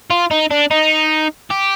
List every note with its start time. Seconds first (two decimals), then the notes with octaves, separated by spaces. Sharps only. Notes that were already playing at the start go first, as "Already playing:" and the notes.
0.10 F4
0.31 D#4
0.51 D4
0.71 D#4
1.51 G4